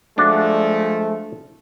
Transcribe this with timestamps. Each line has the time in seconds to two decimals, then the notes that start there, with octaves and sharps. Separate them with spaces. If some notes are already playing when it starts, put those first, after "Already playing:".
0.18 F3 G#3 A3 D4 F#4